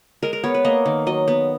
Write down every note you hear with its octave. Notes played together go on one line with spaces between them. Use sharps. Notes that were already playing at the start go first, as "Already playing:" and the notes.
G#3 A#4
A#4
B3 C#5
B4
A#3 D#5
D#3
F#3 D#5
B3